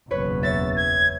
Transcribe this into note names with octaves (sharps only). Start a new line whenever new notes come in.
F#1 B1 E2 B4 C#5
C#5 E5 A6
G#6